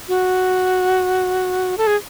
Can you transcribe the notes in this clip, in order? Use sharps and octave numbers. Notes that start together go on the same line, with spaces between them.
F#4
A4
G#4